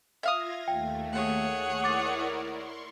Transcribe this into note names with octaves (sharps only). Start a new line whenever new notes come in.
F4 E5 F5 D#6 G#6 A#6
D#2 A3 G5
G#4 C#5 F#5
E4 A#4 D5 D6 A6
C6 C#6